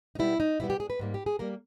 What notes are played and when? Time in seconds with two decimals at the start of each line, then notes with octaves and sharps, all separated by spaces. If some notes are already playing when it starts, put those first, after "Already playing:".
0.15 D#4
0.19 B2 G3 B3 E4
0.40 D#4
0.59 B2 G3 B3 E4
0.70 G4
0.80 G#4
0.90 B4
0.99 G#2 G3 A#3
1.14 G4
1.26 G#4
1.39 G3 A#3 A#4